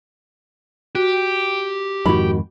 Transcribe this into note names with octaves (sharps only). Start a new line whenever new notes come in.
F#4 G4
F2 G#2 D#3 F#4 B5